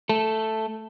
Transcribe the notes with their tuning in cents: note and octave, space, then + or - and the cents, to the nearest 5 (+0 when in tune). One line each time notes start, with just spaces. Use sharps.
A3 +0 A4 +0